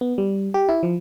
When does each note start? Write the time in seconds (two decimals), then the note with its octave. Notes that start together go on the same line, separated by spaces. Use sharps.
0.01 B3
0.18 G3
0.54 G4
0.69 E4
0.83 F3